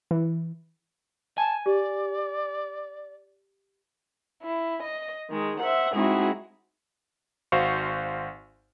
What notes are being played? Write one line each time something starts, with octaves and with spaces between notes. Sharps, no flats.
E3
G#5 A5
G4 D5
E4
D#5
D#3 G#3
C5 E5 F#5
G#3 C4 D#4 E4 F#4 G#4
G#1 F#4 C5 F5 C#6